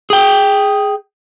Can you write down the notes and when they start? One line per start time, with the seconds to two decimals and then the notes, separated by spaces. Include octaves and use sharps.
0.10 G#4 G5